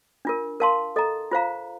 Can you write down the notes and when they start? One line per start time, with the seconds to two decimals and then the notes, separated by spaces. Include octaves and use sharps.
0.25 D4 F4 A#4
0.60 A#4 F5 A5 C6
0.96 A4 D#5 A#5
1.31 F4 C5 F5 A#5